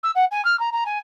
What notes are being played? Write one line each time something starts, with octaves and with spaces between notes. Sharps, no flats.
E6
F#5
G#5
F6
A#5
A#5
G#5